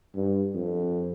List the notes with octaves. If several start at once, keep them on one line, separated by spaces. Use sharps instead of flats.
G2
F2